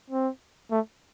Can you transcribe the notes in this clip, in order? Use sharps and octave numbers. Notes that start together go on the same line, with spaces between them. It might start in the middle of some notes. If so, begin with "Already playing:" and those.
C4
A3